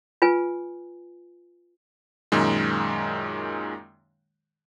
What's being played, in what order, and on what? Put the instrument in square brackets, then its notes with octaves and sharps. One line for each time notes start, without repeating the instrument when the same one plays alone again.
[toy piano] F4 B4 G#5
[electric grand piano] F#2 A#2 D#3 G#3